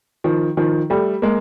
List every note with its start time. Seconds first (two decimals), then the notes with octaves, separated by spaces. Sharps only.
0.24 D#3 F3
0.57 D#3 F3
0.90 G3 A3
1.22 G#3 A#3